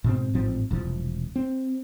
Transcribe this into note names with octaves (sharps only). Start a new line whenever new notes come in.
G#2 B2 C4
A1 G#2 F3 C4
E1 C2 F3
C4